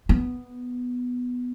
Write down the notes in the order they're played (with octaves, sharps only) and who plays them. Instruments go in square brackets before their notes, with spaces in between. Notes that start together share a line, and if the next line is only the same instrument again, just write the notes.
[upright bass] B3